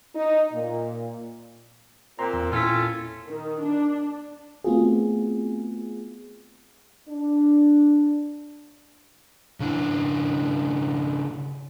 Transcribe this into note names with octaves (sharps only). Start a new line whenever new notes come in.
D#4
A#2
A#2 C4 A#5 C6
E2
A#2 C#4 E4 F4 A4 B6
D#3
D4
A3 B3 C4 F4 F#4 G#4
D4
C#3 D4 E4